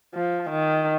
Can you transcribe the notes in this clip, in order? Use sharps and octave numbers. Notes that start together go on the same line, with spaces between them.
F3
D#3